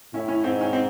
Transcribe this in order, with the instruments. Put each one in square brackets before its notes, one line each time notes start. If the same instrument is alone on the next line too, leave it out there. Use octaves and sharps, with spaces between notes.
[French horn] A2 [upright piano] C#4 E4
[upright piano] C#4 E4
[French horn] G#2 [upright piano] C4 D#4
[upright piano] C#4
C4 D#4